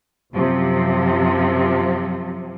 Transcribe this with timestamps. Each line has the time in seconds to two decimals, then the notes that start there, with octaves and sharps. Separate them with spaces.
0.34 F#2 C3 F3